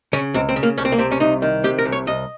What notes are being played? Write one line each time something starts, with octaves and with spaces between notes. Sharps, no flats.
C#3 C#4
C#2 C4
C4
C#3
A#3
C2 C#4
C4
A#3
C3 C4
C#4
C2 D#4
D#3
C3 G4
A#4
C2
C#5
C2 D#5